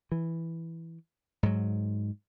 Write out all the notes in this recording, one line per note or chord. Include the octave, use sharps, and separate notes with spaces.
E3
G#2 F#3